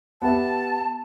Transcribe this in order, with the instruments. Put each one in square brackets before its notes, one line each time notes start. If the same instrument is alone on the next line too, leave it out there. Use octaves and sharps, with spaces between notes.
[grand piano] B3 G4 E5 [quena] A5